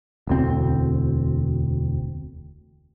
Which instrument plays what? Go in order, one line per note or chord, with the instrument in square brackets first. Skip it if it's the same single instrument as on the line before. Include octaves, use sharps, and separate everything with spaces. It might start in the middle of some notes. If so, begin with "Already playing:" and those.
[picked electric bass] E1 D2 C4